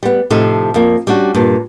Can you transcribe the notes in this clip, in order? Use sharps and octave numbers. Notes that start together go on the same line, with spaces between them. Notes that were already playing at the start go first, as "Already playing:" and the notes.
G3 B3
A2 C3 F3 D#4 A4
F2 A#3
G3 C#4 D4 F#4
G2 A#2